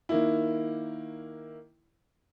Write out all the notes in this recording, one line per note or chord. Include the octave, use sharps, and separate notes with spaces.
D#3 A#3 E4